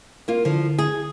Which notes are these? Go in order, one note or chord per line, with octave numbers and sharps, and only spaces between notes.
A#3 F4
D3 F3 E4
G#4